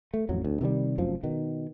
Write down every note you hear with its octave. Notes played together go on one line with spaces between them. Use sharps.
A3
A1 F2 F#3
D2
C3 D#3 F3 G3
F1 F#2 F3
B2 D#3